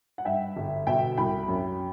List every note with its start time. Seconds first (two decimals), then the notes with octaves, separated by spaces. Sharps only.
0.18 F#5
0.25 G2 E5 G5
0.57 G1
0.87 B2 E5 G5
1.17 C2 G5 B5
1.48 F#2